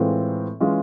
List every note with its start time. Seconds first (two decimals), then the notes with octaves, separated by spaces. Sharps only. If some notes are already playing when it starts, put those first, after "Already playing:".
Already playing: A2 E3 G#3 C4 F4
0.60 E3 G#3 C#4 F4